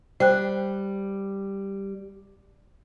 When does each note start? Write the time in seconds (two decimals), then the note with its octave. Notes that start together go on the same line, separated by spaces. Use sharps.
0.20 G3 C5 G5 F#6